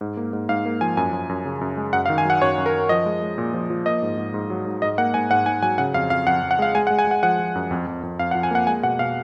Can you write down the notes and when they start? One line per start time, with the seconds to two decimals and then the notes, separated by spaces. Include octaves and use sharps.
0.01 G#2
0.17 A#3
0.33 G#2
0.49 G#2 F5
0.65 A#3
0.81 F3 G#5
0.97 F#2 G#5
1.13 F#2
1.29 F#2
1.45 C#3
1.61 F#2
1.77 G#3
1.93 F#2 F#5
2.06 F5
2.09 D#3
2.18 G#5
2.25 F#3 F#5
2.42 F#2 C#5
2.58 F#2
2.66 A#4
2.74 F#2
2.89 F3 D#5
3.06 G#3
3.22 G#3
3.38 A#2
3.54 F3
3.70 F3
3.86 A#3 D#5
4.02 G#2
4.18 G#2
4.34 G#2
4.50 F#3
4.66 G#2
4.82 G#2 D#5
4.98 A#3 F#5
5.14 G#2 G#5
5.30 G#2 F#5
5.46 G#2 G#5
5.62 F#3 G#5
5.78 C#3 F#5
5.94 F2 F5
6.10 F2 F5
6.27 F2 F#5
6.42 F2
6.51 F#5
6.59 G#3 F5
6.75 G#3 G#5
6.87 F#5
6.90 G#3
6.99 G#5
7.07 G#3 F#5
7.23 F3 F#5
7.39 F3
7.55 F#2
7.71 F2
7.87 F2
8.03 F2
8.19 F2 F5
8.31 F#5
8.35 F3
8.43 G#5
8.51 A#3 F#5
8.67 G#3 G#5
8.83 B2 F#5
8.99 B2 F5